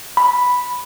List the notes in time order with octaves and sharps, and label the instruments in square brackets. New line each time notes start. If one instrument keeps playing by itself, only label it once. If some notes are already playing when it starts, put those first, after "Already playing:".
[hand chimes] B5